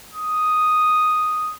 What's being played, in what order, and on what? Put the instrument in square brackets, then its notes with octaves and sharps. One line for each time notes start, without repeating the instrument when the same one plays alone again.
[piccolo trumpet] D#6